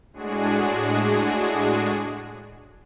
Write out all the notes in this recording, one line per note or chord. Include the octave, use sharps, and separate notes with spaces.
A2 G#3 D4 F#4 G#4